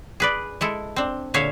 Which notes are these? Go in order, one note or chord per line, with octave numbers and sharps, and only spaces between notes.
G#4 B4 D5
G#3 E4 A4
C4 D4
A#2 D3 G#4 C#5 E5 F5